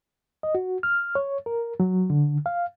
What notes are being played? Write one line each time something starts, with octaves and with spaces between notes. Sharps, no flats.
D#5
F#4
F6
C#5
A#4
F#3
D3
F5